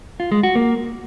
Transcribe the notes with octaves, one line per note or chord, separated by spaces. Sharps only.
F4
G#3
F#4
A#3